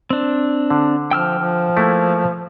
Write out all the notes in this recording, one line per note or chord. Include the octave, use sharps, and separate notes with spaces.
C4 D4
D3
F3 G5 E6 F6
F3
A3 A#3 E4